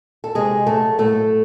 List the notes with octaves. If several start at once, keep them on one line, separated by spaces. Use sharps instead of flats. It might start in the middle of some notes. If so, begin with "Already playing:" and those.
A4
C3 G#3 G#4
F#3 A3 A4
A2 A3 A4